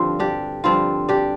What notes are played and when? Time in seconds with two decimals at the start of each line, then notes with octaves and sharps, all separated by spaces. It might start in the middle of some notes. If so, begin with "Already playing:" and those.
Already playing: G2 D3 F3 C4 F4
0.20 D4 G4
0.64 G2 D3 F3 C4 F4
1.09 D4 G4